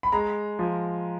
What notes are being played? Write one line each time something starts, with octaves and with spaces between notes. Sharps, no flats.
B5
G#3 A#5
F3